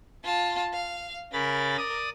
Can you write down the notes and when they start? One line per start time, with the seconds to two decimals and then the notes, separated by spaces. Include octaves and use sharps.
0.24 F4 A5
0.73 F5
1.33 C#3 A#4 B5 A6
1.78 D5 D#6